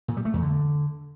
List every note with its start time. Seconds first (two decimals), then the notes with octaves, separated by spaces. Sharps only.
0.08 A#2
0.17 G3
0.25 A3
0.34 E2
0.42 D3